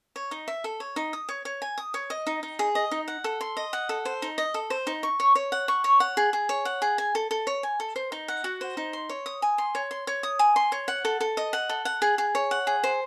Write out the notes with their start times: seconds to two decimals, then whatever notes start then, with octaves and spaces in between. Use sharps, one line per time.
0.16 C#5
0.31 D#4
0.48 E5
0.64 A4
0.80 C#5
0.96 D#4
1.13 D#6
1.29 C#5
1.45 C#5
1.62 G#5
1.78 D#6
1.94 C#5
2.10 D#5
2.27 D#4
2.43 D#4
2.59 G#4
2.75 D#5
2.91 D#4
3.08 F#5
3.24 A4
3.41 C6
3.57 D#5
3.73 F#5
3.89 A4
4.05 C5
4.22 D#4
4.38 D#5
4.54 A4
4.70 C5
4.87 D#4
5.03 C#6
5.20 C#5
5.35 C#5
5.52 F#5
5.68 C#6
5.84 C#5
6.00 F#5
6.17 G#4
6.33 G#4
6.49 C#5
6.65 F#5
6.82 G#4
6.98 G#5
7.15 A4
7.31 A4
7.47 C#5
7.63 G#5
7.80 A4
7.96 C5
8.12 D#4
8.28 F#5
8.44 F#4
8.61 C5
8.77 D#4
8.93 C6
9.09 C#5
9.26 D#6
9.42 G#5
9.58 C6
9.75 C#5
9.91 C6
10.07 C#5
10.23 D#6
10.39 G#5
10.56 C6
10.72 C#5
10.88 F#5
11.05 A4
11.20 A4
11.37 D#5
11.53 F#5
11.69 A4
11.85 F#5
12.02 G#4
12.18 G#4
12.35 C#5
12.51 F#5
12.67 G#4
12.84 C5